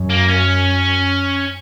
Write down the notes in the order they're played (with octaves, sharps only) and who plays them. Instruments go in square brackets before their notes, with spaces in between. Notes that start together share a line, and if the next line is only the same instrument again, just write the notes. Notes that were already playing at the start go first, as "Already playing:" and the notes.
Already playing: [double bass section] F#2
[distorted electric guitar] A#3
C#4